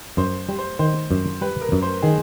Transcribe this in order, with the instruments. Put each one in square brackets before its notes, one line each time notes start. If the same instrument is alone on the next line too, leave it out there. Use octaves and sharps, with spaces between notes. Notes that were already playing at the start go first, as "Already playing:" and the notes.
[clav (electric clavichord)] F#2 [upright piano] C5
[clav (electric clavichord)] G3
[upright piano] C5
[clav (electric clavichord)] D#3 [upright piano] C5
[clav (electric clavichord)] F#2
[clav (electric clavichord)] G3 [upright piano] B4
[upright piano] A#4
[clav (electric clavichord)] F#2
[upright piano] C5
[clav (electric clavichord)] D#3 [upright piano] G#4